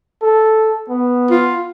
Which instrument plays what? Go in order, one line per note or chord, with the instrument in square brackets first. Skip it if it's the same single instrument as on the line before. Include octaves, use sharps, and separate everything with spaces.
[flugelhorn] A4
B3
[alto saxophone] F4